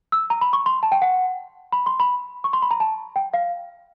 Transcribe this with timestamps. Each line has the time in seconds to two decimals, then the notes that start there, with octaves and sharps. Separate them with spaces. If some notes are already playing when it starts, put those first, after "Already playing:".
0.12 E6
0.30 A#5
0.41 B5
0.53 C#6
0.66 C6
0.83 A5
0.92 G5
1.02 F#5
1.72 B5
1.86 C6
2.00 B5
2.44 C#6
2.53 C6
2.62 B5
2.71 A#5
2.80 A5
3.16 G5
3.34 F5